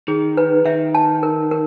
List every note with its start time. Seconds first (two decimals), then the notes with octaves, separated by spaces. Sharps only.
0.08 D#3 G#4
0.37 B4
0.65 D#3 E5
0.95 A5
1.23 A#4
1.51 A#4